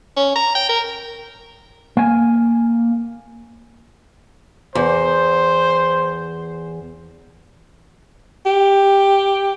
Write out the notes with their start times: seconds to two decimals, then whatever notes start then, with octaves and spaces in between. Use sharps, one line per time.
0.17 C#4
0.36 A#5
0.55 G5
0.69 A#4
1.97 A#3 G#5
4.75 E2 C5
8.46 G4